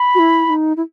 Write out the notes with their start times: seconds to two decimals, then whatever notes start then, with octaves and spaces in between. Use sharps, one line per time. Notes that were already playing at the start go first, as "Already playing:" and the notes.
Already playing: B5
0.15 F#4
0.19 E4
0.46 E4
0.50 D#4
0.77 E4